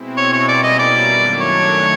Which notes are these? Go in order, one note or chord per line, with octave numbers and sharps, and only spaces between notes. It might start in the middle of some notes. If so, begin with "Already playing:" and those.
Already playing: B2 G#3 C4 E4
C#5
C#5
B2 G3 A#3 C#4 E4 D5
D#5
D5
F#2 D#3 F#3 A3 D4
C#5